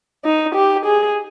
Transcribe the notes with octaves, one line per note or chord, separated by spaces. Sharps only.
D#4
G4
G#4